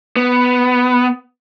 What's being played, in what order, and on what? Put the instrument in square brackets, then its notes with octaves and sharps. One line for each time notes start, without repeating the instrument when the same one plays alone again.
[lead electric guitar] B3